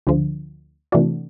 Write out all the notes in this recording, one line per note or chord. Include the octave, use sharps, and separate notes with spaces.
D2 D3 F3
C3 E3 A3 D4 F#4